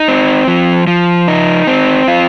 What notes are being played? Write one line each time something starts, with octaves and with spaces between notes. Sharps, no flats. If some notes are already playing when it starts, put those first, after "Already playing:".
Already playing: D#4
C4
F3
F3
D#4
C4
F4